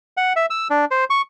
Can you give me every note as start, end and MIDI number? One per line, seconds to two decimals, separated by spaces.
0.17 0.33 78
0.36 0.46 76
0.50 0.68 88
0.70 0.85 62
0.91 1.04 72
1.10 1.22 85